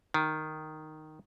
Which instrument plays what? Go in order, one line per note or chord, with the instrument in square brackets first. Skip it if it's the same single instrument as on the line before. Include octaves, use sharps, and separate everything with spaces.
[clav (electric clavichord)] D#3